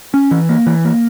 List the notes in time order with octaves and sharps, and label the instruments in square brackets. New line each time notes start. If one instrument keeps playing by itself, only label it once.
[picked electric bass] C#4
E3
A#3
E3
A#3